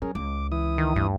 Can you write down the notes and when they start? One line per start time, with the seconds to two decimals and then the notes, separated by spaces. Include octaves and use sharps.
0.02 F#3 C#4 G#4 A#4
0.15 C#2 D6
0.52 E3 E4 D#6
0.78 D#3
0.96 D2 G2